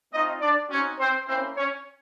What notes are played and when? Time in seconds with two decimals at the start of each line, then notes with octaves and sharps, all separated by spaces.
0.11 A3 C4 D#4 F4 D#5
0.41 D4 D5
0.69 C4 C#4 D#4 F#4 C#5
0.98 C4 C5
1.27 A#3 C4 C#4 E4 C5
1.55 C#4 C#5